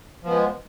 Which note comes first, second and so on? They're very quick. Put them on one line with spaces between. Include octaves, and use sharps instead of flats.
F3 B3 G#3